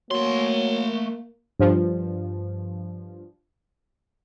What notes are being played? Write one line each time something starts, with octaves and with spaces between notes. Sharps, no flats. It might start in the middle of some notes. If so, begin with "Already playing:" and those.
F#3 A3 A#3 C6
G2 F3